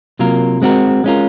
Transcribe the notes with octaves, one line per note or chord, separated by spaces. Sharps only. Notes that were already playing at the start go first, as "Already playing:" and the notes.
C3 F#3 A#3 F4 A#4
G#3 C4 F#4 A#4
G#3 C#4 F4 A#4